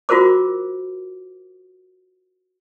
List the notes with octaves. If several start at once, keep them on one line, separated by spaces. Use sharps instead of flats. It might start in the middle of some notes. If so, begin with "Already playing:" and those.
F4 F#4 A#4 C5 D6